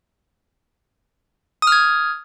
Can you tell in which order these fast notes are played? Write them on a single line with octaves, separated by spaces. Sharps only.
D#6 F6 G#6